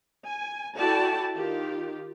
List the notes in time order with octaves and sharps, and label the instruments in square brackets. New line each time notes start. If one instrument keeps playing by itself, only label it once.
[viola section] G#5
E4 F#4 A4 D5 G5 A5
D#3 F4 G4